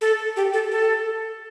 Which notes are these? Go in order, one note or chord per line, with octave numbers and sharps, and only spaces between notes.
A4
G4
A4
A4